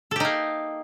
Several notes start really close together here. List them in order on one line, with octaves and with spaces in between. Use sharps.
A4 G4 D#4 A#3